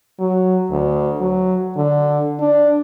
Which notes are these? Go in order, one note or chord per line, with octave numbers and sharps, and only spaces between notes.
F#3
D2
F#3
D3
D4